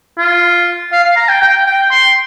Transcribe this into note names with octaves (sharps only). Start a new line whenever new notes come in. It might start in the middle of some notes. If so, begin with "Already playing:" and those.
F4
F5
F5
A#5
G5
G5
G5
C6